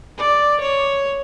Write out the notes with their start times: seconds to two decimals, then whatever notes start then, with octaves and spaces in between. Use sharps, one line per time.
0.18 D5
0.60 C#5